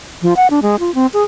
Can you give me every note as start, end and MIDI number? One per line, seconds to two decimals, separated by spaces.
0.22 0.34 53
0.37 0.47 78
0.50 0.60 62
0.63 0.76 56
0.80 0.93 65
0.95 1.06 60
1.14 1.23 68